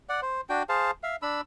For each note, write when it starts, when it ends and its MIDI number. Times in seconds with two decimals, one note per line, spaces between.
0.09 0.21 74
0.09 0.21 78
0.22 0.41 72
0.49 0.63 62
0.49 0.63 66
0.49 0.63 79
0.69 0.91 68
0.69 0.91 72
0.69 0.91 77
0.69 0.91 81
1.03 1.16 76
1.03 1.16 77
1.22 1.41 62
1.22 1.41 83
1.22 1.41 88